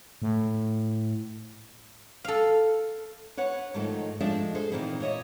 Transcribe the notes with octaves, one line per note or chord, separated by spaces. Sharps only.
A2
A4 F5
B4 C#5 F#5
G#2 D#3 F3 A3 D#4
F3 G#3 A3 D4 D5 E5
G#4 A4 C5
A#2 D#3 E3 C4 E4
A#2 C#5 D#5 E5